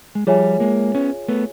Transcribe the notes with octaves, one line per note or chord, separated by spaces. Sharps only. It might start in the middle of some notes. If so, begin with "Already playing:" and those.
G#3
F3 G3 F4 G#4 C#5 E5 G#5
G#3 A#3
B3 C#4
A3 B3